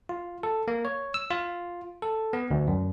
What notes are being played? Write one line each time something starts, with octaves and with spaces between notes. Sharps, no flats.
F4
A4
A#3
C#5
E6
F4
A4
B3
D2
F#2